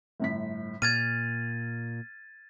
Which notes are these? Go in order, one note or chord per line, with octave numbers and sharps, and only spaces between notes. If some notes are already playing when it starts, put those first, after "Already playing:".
G1 A2 B6
A#2 F6 G#6 A6 D#7